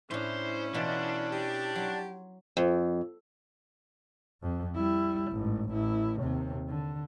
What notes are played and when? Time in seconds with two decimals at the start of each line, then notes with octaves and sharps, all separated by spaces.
0.11 A2 C#4 D4 E4 C5
0.74 B2 E3 D4 F4
1.32 G4 D#5
1.75 F#3 C6
2.57 F2
4.43 F2
4.75 G3 E4
5.32 A1 G#2
5.70 A1 E4
6.20 D#2 C3
6.69 D3